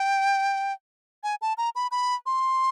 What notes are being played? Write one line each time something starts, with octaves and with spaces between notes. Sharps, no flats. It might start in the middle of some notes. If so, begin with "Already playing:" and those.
Already playing: G5
G#5
A5
A#5
B5
B5
C6